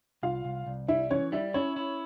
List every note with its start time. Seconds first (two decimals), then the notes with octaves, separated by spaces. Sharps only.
0.23 C2 F4 F5
0.45 C2
0.67 C2
0.88 G3 E4 E5
1.10 E3 C#4 C#5
1.32 G3 E4 E5
1.54 C#4 E4 C#5
1.76 E4